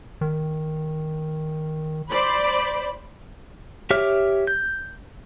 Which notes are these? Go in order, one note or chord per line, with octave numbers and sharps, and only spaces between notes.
D#3
C5 D5 B5
G4 C#5 E5 D6 F6
G6